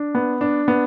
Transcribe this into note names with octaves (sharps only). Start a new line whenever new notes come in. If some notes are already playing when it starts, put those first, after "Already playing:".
Already playing: D4
B3
D4
B3